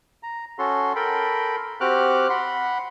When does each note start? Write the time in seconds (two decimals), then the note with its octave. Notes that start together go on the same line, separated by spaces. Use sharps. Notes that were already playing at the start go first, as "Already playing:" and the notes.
0.23 A#5
0.59 C#4 F#4 A4 C6
0.96 A4 A#4 G5 B5 C6
1.81 C4 F#4 G4 D6 F6 F#6
2.30 F#5 B5 C6